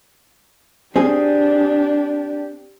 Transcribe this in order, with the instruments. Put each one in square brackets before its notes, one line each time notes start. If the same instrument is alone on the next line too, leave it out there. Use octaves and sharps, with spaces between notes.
[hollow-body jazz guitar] C4 G#4 [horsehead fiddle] D4 G4